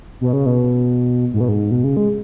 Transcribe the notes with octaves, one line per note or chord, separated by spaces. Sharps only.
B2
C#3
B2
G#2
B2
G#2
B2
C#3
G#3